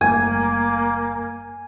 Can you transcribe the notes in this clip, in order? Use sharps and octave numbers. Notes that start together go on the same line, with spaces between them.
F#1 G3 A3 A#3 G#5